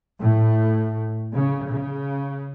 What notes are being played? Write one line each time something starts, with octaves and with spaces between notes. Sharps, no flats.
A2
C#3
C#3